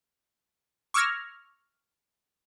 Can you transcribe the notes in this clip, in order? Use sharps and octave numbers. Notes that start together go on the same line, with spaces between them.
C#6 D6 E6 F6 G#6 A#6